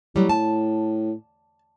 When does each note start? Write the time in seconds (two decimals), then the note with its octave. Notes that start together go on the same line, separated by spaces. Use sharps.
0.16 A2 F#3 G3
0.29 A5